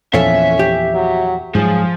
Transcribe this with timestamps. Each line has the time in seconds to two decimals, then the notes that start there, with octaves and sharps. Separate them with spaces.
0.14 E2 A#2 F3 C#4 A4 C#5 E5 F5
0.59 G4
0.94 F#3
1.55 G#2 F3 F#3 G#4